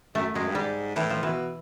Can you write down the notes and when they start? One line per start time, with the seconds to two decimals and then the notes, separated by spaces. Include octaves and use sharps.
0.15 F#2 A3
0.34 F#2 G#3
0.48 G2
0.55 G#2 G3
0.96 A2 E3
1.10 F3
1.23 B2 E3